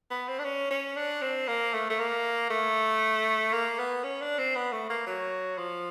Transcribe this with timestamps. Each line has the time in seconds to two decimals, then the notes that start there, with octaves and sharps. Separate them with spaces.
0.11 B3
0.28 C4
0.39 D4
0.45 C#4
0.71 C#4
0.96 D4
1.22 C4
1.48 A#3
1.74 A3
1.90 A3
1.99 A#3
2.50 A3
3.53 A#3
3.79 B3
4.04 C#4
4.21 D4
4.39 C4
4.56 B3
4.73 A3
4.90 A#3
5.07 F#3
5.58 F3